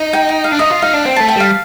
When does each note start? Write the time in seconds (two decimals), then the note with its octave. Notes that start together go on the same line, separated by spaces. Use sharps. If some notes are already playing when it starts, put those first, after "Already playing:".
Already playing: D#4
0.13 G5
0.29 G5
0.44 F5
0.52 D4
0.59 D#4 D#5
0.70 F4
0.82 D#4 F5
0.94 D4
1.05 C4 G5
1.16 A3 A5
1.28 G5
1.36 G3 F5